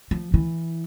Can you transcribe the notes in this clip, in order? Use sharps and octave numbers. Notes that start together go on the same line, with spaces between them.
F3
E3